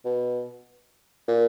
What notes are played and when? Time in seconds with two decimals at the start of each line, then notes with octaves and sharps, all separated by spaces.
0.05 B2
1.28 A#2